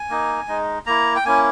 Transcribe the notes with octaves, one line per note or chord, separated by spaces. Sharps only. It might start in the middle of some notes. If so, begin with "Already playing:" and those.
Already playing: G#5
A#3 D#4
G#3 D#4
A#3 E4 A#5
G5
A#3 C#4 E4 G#5